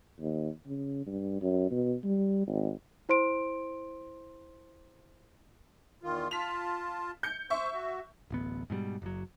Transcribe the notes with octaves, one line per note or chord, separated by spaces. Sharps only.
D#2
C#3
G2
F#2
B2
G3
G#1
E4 C5 C6 D7
E2 D#3 F4
F4 A5 B6 F7
G6 C#7
C5 E5 C#6
F#4
D1 A1 B3
G#2 B2 F3 G3
F#1 F#3